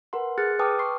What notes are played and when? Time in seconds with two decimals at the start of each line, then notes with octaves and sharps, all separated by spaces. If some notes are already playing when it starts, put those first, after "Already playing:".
0.13 A#4 B4 F#5 C6
0.38 G#4 F6 F#6 A6 C#7
0.59 B4 G5 A5 D6 D#6 F6
0.79 C6 C#6 C7